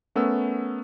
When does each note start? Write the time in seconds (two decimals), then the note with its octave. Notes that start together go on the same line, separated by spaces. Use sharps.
0.16 A3 B3 C#4 A#4 E6